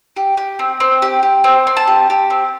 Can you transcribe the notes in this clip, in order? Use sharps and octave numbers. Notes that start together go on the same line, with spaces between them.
G4
G4
C4
C4
G4
G4
C4
C4
A5
G4
G4
C4